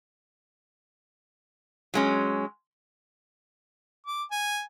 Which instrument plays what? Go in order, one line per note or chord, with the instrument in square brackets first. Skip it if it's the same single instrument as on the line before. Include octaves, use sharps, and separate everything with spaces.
[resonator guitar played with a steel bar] F#3 G#3 C#4
[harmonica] D6
G#5